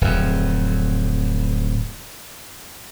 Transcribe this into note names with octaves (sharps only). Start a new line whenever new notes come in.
D1 F2